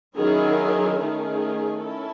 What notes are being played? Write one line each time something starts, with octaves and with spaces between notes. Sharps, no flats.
D#3 F#3 C#4 E4 G#4
D#3 A3 C#4 G#4
C#4 E4 A4